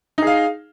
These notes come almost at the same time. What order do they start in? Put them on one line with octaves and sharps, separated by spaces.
D#4 G#4 F5